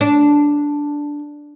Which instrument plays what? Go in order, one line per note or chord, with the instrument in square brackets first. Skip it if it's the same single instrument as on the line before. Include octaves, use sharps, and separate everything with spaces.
[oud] D4